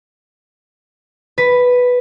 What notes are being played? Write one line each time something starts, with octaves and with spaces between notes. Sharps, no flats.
B4